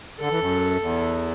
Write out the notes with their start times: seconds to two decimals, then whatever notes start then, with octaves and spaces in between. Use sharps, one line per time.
0.20 D3 A4
0.31 E3
0.40 F#2
0.81 E2